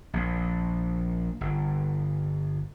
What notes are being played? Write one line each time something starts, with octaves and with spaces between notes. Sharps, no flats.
A#1
G1